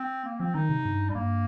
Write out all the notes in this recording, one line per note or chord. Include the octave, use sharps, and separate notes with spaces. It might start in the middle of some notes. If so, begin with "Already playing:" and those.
Already playing: C4
A#3
F3 C4
D#3 D#4
C3
G2
G3
G2 A#3